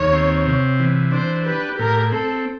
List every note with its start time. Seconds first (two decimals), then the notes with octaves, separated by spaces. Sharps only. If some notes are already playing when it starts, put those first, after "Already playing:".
Already playing: D#2 C#5
0.13 C4
0.46 C3
0.79 E3
1.12 D4 C5
1.46 G4 B4
1.78 A2 A#4
2.12 C4 A4